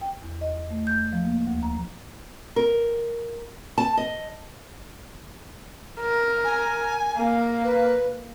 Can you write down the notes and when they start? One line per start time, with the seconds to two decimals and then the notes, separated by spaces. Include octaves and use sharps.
0.01 G5
0.22 E2
0.41 D#5
0.70 A3
0.87 G6
1.13 F3
1.24 A#3
1.47 D2
1.63 A#5
2.56 A#4
3.78 A5
3.97 D#5
6.00 A#4
6.44 G#5
7.17 A#3
7.64 B4